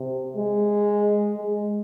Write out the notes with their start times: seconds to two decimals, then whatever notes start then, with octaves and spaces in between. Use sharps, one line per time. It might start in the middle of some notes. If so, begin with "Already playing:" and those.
Already playing: C3
0.36 G#3
1.37 G#3